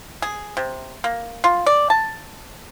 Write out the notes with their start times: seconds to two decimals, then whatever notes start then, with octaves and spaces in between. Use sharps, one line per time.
0.22 G#4
0.57 C3
1.04 A#3
1.44 F4
1.66 D5
1.90 A5